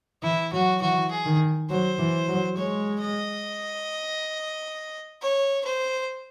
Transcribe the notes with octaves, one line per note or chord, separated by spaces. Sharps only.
E3 E4
F#3 F#4
E3 F#4
G#4
D#3
F#3 C5
E3
F#3
G#3 C#5
D#5
C#5
C5